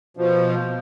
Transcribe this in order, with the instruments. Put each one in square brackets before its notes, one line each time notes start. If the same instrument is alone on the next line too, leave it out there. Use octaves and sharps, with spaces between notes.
[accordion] B2 F3